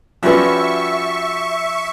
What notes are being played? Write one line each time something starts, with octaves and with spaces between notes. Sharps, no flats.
F3 G3 C#4 F#4 B4 E5 C#6